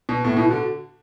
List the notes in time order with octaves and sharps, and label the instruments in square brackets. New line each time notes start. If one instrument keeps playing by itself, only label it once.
[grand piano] B2
[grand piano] A2 [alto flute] B3
[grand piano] B2 [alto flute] E4
[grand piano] D3 [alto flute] F#4